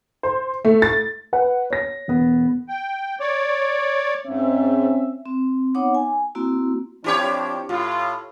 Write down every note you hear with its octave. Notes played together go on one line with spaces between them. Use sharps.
C5
A3
A6
B4 F#5
C#5 A#6
E1 B3
G5
C#5 D5
G#2 C4 C#4 E5
C4
B3 D#4 C#5 F#5 D6
G#5
A#3 C4 E4 F#4
F3 C4 D4 E4 G4 C#5
A2 F4